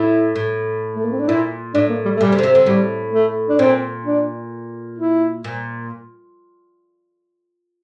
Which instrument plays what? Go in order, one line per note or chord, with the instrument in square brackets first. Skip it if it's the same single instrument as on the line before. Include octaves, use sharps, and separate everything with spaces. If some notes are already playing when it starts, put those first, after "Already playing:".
Already playing: [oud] A2 [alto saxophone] E4
[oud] A2
[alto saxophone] A3
A#3
C4
D4
[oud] A#2 [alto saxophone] E4
[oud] A2 [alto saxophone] D4
[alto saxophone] A#3
G3
A3
[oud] A#2 [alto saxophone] G3
[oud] C3
D3
C3
D3
[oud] A2 [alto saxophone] G3
[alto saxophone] A3
D4
[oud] A#2 [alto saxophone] C4
[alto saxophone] D4
E4
[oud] A#2